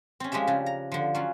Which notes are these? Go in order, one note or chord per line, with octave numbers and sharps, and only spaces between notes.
C4 C#4
F3 G#3 A3 G4 E5
C#3 D4
A#5
D3 F3
F#3 C#4 F4